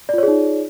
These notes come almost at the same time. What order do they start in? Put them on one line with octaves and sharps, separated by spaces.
D5 F4 C#5 G#4 D#4